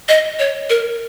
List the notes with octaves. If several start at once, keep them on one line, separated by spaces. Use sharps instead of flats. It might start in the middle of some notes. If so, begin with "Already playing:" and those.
D#5
C#5
A#4